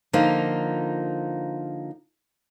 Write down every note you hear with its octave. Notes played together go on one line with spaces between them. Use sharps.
D3 F3 A#3 D#4 F4